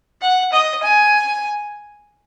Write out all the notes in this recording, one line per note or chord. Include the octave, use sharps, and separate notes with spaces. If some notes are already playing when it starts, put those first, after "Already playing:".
F#5
D#5
G#5